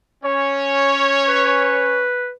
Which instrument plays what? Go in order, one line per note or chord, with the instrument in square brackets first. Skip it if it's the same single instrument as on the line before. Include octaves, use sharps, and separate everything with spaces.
[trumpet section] C#4 C#5
[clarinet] B4